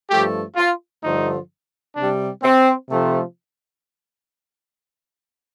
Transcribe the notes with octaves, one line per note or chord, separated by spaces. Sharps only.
G2 F3 A3 G4
F4
G2 D3 F3 A3 D#4
C3 G3 D4
C4
C3 F3 A3